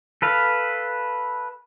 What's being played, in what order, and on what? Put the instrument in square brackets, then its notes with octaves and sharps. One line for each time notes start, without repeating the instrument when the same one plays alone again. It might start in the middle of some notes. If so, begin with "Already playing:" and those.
[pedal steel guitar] A4 B4 F5